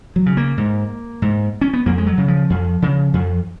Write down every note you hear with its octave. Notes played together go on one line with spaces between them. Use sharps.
F#3
C#3
A#3
G#2
G#2
C#4
B3
F2 A#3
G#3
F#3
C#3
F3
F2
C#3
F2